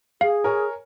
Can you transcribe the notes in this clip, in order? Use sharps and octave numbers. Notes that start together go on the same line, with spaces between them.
G#4 F5
A#4 C#5 G#5